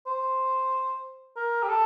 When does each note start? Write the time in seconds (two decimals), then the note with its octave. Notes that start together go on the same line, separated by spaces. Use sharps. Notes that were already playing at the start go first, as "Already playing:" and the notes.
0.07 C5
1.37 A#4
1.63 G4
1.69 A4